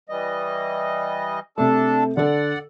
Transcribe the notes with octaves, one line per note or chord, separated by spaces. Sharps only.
E3 G3 D#5
C3 A3 D4 A4 A5
D3 A4 D5 F#5